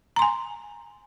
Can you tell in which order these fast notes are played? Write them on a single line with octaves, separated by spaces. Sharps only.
A#5 C6 G#5